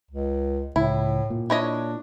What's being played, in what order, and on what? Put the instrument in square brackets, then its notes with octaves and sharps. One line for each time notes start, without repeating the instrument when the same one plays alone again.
[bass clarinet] C#2
[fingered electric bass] C#2 [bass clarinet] A2 [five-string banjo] E4
[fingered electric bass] A#2
[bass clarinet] D4 [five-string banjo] E4 C#5 D#5